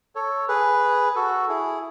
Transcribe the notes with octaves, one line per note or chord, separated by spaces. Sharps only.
A4 C#5
G#4 B4
F#4 A4
E4 G#4